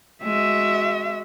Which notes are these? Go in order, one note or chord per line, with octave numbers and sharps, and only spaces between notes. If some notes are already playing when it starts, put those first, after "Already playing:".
G#3 F#4 E5